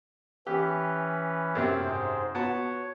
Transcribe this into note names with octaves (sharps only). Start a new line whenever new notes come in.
E3 C#4 G4 B4
F#2 C3 A3 C4
G#2 C5
B3 F#4 C#5 A5